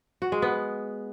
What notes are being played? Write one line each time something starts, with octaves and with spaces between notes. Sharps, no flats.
F#4
G#3
B3